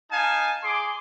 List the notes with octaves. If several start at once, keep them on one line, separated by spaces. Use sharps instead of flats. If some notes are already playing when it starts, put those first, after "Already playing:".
D#4 F5 G#5 A5
G#4 C6 D6